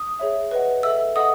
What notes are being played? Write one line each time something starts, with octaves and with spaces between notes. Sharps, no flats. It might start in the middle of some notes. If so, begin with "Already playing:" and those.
Already playing: D#6
G#4 C#5 E5
B4 D#5 F#5
A4 E5 E6
A4 D#5 F#5 D#6